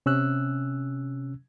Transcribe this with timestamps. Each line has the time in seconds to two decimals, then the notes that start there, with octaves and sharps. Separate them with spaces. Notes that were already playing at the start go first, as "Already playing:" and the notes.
0.06 C3 C#4 E6 F#6